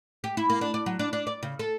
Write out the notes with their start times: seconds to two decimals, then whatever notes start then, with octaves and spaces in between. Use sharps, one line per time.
0.24 G4
0.37 E4
0.50 A#3
0.61 D4
0.74 D5
0.86 F#3
0.99 D4
1.13 D4
1.27 D5
1.43 C#3
1.59 A4